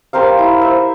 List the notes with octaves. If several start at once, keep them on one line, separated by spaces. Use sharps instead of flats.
G4 A#4 C5 F5
E4
C5 E5